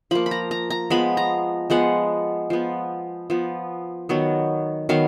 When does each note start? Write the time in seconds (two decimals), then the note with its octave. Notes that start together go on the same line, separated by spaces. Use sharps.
0.11 F3 A#3 B5
0.26 B5
0.31 A#5
0.51 A#5
0.70 A#5
0.90 F3 G#3 B3 B5
1.17 A#5
1.70 F3 G#3 B3 F#5
2.50 F3 B3
3.30 F3 B3
4.09 D#3 F#3 B3
4.89 D#3 F#3 B3 F5